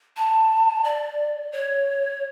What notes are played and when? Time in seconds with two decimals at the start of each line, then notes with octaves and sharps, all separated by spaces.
0.16 A5
0.84 D5
1.52 C#5